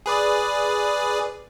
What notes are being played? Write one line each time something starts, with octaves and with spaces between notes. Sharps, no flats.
G#4 B4 D5